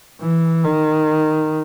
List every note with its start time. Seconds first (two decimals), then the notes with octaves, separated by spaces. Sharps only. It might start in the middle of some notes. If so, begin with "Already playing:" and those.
0.21 E3
0.64 D#3